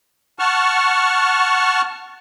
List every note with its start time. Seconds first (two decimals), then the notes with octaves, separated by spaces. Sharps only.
0.39 F#5 A5 C#6 F6